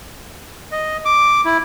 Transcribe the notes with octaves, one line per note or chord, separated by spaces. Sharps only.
D#5
D6
E4